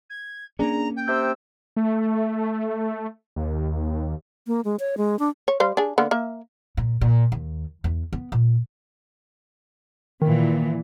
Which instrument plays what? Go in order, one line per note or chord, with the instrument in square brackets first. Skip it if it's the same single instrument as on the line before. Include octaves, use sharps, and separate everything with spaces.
[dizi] G#6
[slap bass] A#3 B3 C#4 [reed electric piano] D4 G#4 [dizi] A#5
[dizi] G5
[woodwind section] C3 E6 [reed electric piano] G6
[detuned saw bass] A3
D#2
[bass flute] A#3
G#3
C#5
G#3
D4
[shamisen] C#5
G3 C5 F5
D4 G#4
D3 A#3 B3
A#3 E5
[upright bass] A#2
A#2
D#2
E2
B3
A#2
[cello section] A#2 E3 [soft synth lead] D#3